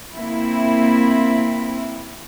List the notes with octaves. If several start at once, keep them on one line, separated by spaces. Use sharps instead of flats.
A#3 C4 E4